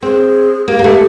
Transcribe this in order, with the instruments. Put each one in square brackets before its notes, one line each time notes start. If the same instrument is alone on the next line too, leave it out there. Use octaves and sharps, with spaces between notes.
[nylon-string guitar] C4 [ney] G#4
[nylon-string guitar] A#3 [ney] G4
[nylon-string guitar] A#3
A3